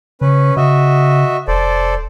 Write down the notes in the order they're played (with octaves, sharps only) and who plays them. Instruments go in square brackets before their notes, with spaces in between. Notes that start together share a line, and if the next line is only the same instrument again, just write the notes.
[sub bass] C#3 [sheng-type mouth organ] C#4 B4
[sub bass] C#3 [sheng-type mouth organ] F#4 D#5 E5
[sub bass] F1 [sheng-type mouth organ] A4 C5 D5